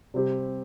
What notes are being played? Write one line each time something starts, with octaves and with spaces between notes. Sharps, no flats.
C3 G3 C4 G4